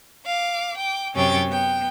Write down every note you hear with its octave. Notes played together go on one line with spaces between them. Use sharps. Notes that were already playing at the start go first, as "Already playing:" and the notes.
F5 D6
G5 D6
F#2 C3 C#4 C#5 G5 A6
B3 G5